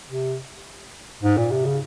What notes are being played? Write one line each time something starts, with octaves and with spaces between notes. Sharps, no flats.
C3
G#2
A#2
C3
C#3